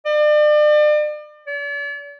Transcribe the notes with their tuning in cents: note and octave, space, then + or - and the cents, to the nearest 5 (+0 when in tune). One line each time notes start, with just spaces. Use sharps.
D5 +40
D5 -45